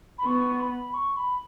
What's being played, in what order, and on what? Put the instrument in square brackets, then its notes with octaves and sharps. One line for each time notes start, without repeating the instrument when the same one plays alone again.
[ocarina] B5
[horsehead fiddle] B3 [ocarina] C#6
[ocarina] C#6
B5
C#6
B5